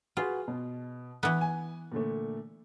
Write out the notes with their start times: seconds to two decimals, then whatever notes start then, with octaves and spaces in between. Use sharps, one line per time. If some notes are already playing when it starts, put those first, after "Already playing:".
0.17 F4 F#4 G#4 B4
0.48 B2
1.23 E3 B3
1.41 G#5
1.92 A#2 D3 A3